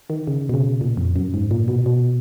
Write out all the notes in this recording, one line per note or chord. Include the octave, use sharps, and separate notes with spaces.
D#3
C#3
B2
C#3
A#2
F2
F#2
G#2
A#2
B2
B2